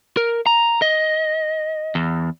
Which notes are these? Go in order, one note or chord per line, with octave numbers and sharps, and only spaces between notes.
A#4
A#5
D#5
E2